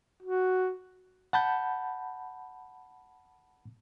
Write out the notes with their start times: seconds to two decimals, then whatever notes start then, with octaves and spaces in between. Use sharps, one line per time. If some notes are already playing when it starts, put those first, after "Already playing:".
0.23 F#4
1.33 F#5 A5 B5 G6